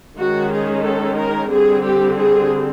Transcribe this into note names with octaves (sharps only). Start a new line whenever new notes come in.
D#3 G#3 C#4 F#4
G#4
A4
A#4
D3 G3 C4 G#4
G4
G#4